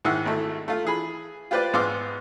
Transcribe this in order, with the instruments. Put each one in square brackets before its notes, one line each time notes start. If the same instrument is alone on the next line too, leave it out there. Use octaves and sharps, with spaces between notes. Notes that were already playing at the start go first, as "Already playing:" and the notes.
[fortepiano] G#2 D#3 E4 F#5 E6
G#1 A3 E4
A3 F4
E3 G#4 B5
F4 G4 B4 C5 D5
G#2 B3 F5 C6 D6 E6